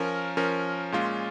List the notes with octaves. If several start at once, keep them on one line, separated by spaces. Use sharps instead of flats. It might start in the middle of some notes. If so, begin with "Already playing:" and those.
Already playing: F3 C#4 A#4
F3 C#4 A#4
A#2 G#3 C#4 F4